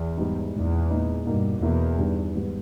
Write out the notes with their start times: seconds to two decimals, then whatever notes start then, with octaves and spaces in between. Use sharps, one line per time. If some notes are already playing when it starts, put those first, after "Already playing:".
Already playing: E2
0.17 G#2 G3 B3 D#4
0.53 E2 A#2 G#3 D#4
0.90 A#2 G#3 D#4
1.25 G2 B2 A#3 D#4
1.62 E2 B2 A#3 E4
1.98 G2 D#3 G3 B3
2.35 G#2 E3 G3 B3